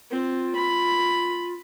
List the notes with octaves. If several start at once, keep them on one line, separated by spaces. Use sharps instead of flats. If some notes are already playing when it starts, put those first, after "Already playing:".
C4 F4
B5